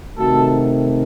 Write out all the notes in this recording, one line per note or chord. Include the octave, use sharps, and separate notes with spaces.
C3 D#3 A3 F#4 A4